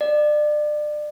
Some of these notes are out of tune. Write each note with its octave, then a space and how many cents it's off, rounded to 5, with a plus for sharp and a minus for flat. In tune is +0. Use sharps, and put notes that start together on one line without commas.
D5 +30